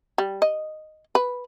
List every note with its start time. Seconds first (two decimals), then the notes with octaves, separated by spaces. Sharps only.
0.18 G3
0.42 D#5
1.15 B4